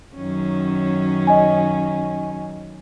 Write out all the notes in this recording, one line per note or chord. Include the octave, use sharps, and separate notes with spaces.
F#2 D#3 C#4
D#5 G#5